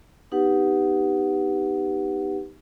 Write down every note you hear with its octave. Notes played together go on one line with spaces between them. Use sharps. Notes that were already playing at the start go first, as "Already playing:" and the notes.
B3 D#4 G4 B4 F#5